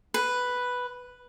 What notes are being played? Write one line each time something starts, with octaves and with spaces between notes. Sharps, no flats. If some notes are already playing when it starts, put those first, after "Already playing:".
B4